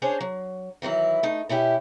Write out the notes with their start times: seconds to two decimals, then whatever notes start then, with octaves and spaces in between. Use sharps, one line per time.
0.02 C#4 D4 G#4 C5 C#5
0.20 F#3
0.82 D#3 E3 F#3 E4
1.23 A3 D#4
1.49 B2 C#4 E4 G4